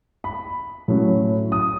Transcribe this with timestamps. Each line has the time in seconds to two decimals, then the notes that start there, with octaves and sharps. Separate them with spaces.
0.24 B5
0.88 A2 F#3 C#4
1.52 D#6